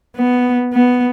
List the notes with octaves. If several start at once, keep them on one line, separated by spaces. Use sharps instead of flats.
B3
B3